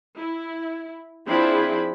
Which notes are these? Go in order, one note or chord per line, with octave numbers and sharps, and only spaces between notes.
E4
F3 C4 D4 E4 G#4 B5